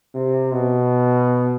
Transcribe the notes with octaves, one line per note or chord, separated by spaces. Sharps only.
C3
B2